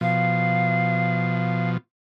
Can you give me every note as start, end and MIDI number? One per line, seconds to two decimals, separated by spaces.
0.01 1.77 47
0.01 1.77 53
0.01 1.69 77